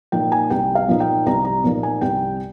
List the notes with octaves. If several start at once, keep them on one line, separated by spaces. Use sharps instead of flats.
A#2 F3 A#3 D#4 G5
G#5
C2 G5
F5
A#2 F3 A#3 D#4
G5
C2 A#5
A#5
A#2 F3 A#3 D#4
G#5
C2 G5